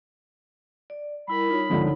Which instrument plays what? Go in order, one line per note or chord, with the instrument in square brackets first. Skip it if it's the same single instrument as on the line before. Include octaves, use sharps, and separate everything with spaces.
[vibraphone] D5
[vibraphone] G3 E4 A#4 [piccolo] B5
[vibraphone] D#4 F4 C#5
[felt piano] C#2 D3 F3